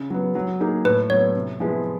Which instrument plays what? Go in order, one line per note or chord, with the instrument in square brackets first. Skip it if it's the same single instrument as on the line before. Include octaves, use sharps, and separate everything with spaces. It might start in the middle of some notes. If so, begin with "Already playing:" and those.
Already playing: [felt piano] C#3
F#3 B3
F#3
A#3 D#4 G#4
[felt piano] A2 [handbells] B4
[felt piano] F#3 B3 [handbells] C#5
[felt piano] C3
F3 G#3 B3 E4